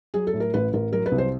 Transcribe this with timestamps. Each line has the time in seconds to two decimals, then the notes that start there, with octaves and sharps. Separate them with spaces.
0.14 F#3 G#4
0.27 A4
0.34 A2
0.40 A#4
0.54 A1 B4
0.73 A1 A#4
0.92 F#3 A#4
1.06 B4
1.12 C2
1.18 C5